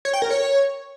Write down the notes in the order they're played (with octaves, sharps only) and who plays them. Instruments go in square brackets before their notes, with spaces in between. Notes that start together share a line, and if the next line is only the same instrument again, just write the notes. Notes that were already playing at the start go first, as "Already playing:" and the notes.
[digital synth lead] C#5
G5
A#4
C#5